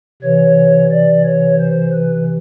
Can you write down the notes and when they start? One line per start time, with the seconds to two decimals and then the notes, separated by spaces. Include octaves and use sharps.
0.22 C3 E3 C#5
0.91 D5
1.25 C#5
1.59 C5
1.93 B4